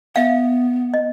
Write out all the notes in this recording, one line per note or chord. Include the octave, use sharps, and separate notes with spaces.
B3 E5 F5
D#5